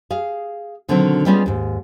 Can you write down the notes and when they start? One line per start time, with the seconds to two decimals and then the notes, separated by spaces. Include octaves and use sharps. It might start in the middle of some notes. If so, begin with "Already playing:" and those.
0.11 G#4 F5
0.89 B2 D3 D#3 F#3 C4
1.26 G3 G#3 B3 C#4 F4 G#4
1.46 D#2 G#2